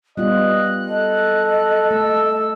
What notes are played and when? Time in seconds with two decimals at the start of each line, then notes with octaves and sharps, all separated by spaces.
0.17 G3 B3 F4 D#5 F#6
0.88 A4 D#5
1.91 A3 E6